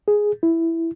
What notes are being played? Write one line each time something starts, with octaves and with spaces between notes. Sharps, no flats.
G#4
E4